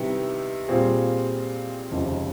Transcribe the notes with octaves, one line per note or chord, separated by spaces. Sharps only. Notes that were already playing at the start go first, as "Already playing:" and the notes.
Already playing: C3 D#3 G3 B3 E4
A#2 G3 C4 F4 G#4
F1 D#2 C#3 F3 G#3